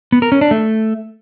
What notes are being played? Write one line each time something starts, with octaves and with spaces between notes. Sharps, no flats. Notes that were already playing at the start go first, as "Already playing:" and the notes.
B3
A#4
C#4
D4
A3